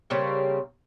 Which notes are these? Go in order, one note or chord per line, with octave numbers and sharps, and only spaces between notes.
C#3 G3 A#3 C4